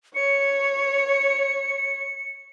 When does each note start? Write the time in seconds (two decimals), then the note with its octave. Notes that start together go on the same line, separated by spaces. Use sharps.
0.15 C#5 C#7